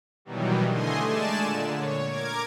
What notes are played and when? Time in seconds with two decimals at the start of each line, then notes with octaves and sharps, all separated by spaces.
0.25 B2 D#3 E3 F#3 G3
0.69 D3 A3 D#5 G#5 C6
1.06 G#3 A3 D5 G#5 A5 E7
1.40 A#2 D3
1.75 C#5
2.06 A#4 D6 G#6